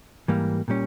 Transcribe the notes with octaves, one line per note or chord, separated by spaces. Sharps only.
G#2 E3 G3 A#3
A#2 G3 C#4